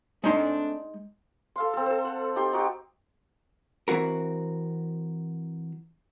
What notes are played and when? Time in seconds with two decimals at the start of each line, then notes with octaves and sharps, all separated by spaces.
0.24 G#3 A3 C4 D4 D#4 C6
1.56 A4 F5 C6
1.74 C4 A4
1.86 A4 C5
2.04 F#5
2.36 D#4 G4 C6
2.53 D#4 F#4 G4
3.88 E3 C4 F#4 A#4